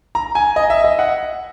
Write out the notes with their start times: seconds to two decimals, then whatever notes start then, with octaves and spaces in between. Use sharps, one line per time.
0.15 A#5
0.35 G#5
0.56 D#5
0.70 E5
0.84 D#5
0.99 F#5